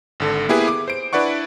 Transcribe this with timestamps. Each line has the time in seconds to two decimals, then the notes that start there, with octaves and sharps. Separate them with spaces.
0.20 G#1 D3 A4
0.48 A#3 B3 E4 G4 G#4 B4
0.68 D6
0.88 C5 D7
1.13 D4 E4 B4 D5 F#5 C#6